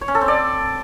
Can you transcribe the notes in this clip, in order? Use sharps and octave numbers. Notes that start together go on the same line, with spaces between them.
C#5
C#4
A4
C4
D5